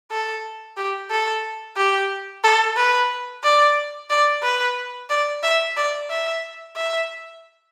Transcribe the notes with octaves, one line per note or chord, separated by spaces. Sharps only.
A4
G4
A4
G4
A4
B4
D5
D5
B4
D5
E5
D5
E5
E5